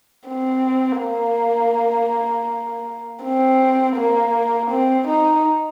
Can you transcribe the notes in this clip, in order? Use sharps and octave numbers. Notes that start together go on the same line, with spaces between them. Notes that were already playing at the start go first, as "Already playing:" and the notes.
C4
A#3
C4
A#3
C4
D#4